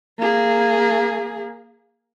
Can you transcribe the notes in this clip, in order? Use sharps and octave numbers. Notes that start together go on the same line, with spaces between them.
A#3 G#4